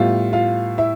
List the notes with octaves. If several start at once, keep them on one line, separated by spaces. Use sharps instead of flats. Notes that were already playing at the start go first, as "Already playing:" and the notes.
Already playing: A2 G3 B3 F4 F5
F4 F5
E4 E5